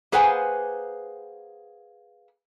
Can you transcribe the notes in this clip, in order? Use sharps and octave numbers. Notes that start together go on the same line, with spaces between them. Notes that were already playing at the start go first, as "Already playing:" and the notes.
A#3 G#4 B4 C5 F#5 G#5